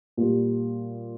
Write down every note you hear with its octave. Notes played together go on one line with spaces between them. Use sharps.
A#2 G3